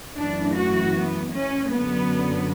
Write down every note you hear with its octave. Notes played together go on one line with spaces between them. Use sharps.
F#2 E3 A3 D4
F#4
B3
C#4
F#2 D3 F#3 B3